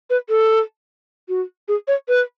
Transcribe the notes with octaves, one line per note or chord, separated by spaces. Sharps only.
B4
A4
F#4
G#4
C#5
B4